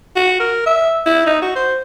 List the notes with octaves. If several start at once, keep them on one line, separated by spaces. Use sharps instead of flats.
F#4
A#4
E5
E4
D#4
F#4
C5